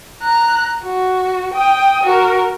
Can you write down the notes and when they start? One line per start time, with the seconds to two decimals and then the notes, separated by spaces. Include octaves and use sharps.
0.23 A#5 F#6
0.84 F#4
1.54 G5 D#6
2.03 F#4 A#4